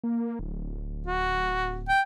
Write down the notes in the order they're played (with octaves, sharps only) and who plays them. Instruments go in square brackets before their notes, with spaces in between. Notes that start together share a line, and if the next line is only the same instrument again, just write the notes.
[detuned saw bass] A#3
D1
[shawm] F#4
G5